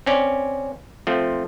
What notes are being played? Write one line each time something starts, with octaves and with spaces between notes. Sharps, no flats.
C4 C#4 D5
F3 A3 C4